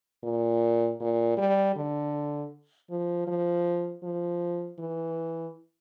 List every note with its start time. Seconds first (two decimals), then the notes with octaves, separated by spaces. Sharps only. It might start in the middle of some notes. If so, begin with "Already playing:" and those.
0.24 A#2
1.00 A#2
1.37 G3
1.76 D3
2.90 F3
3.27 F3
4.03 F3
4.79 E3